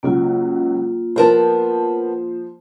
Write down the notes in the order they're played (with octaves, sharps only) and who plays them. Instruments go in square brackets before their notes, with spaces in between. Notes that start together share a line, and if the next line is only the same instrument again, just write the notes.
[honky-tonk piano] C#2 F#3 [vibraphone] A#3 F4
[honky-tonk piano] F3 C5 [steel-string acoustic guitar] B3 A#4 A5